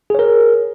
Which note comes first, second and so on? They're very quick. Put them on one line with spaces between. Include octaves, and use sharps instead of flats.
G#4 C#5 A#4